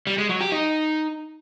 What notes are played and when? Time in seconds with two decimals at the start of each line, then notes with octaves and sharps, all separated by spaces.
0.07 G3
0.18 G#3
0.29 F#3
0.41 G4
0.52 D#4